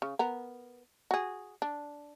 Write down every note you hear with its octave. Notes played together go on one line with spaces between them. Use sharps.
C#3
B3 A#4
F#4 G#4
D4